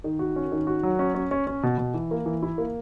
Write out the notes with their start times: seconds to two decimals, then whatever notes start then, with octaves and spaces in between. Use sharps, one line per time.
0.04 D#3
0.19 F#4
0.36 C#4
0.52 D#3
0.67 F#4
0.83 F#3
0.99 C#4
1.15 C#4
1.31 C#4
1.47 C#4
1.63 B2
1.78 B2
1.94 E3
2.11 A#3
2.26 E3
2.43 E4
2.58 A#3